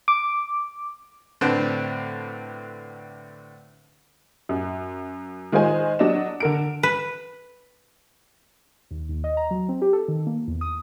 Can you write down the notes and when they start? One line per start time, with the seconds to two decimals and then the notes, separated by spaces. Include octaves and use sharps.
0.08 D6
1.41 A2 D3 C4 D4 B4 A5
4.49 F#2
5.52 D#3 G#3 D#4 F4 C5 G#5
5.99 F#3 D4 D#5 E7
6.40 D3 A#4 D7
6.83 B4
8.91 D#2
9.09 D#2
9.24 D#5
9.37 A#5
9.51 F#3
9.69 C4
9.82 G4
9.93 A4
10.08 D#3
10.27 A#3
10.48 E2
10.61 D#6